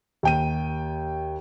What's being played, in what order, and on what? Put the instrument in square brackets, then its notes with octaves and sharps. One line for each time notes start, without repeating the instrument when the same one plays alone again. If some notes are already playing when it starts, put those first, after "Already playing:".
[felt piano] D#2 G5 D#7